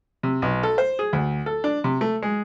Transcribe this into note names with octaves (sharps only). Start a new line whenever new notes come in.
C3
B1
A4
C5
G#4
D2
A4
D4
C3
A3
G#3